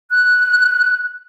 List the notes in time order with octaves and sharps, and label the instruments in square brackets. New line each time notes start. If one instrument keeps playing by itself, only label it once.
[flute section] F#6